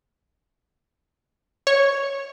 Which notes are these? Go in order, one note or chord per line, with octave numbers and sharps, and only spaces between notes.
C#5